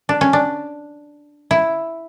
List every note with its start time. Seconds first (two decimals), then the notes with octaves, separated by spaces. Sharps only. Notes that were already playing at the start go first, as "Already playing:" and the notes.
0.09 D4
0.21 C#4
0.33 D4
1.51 E4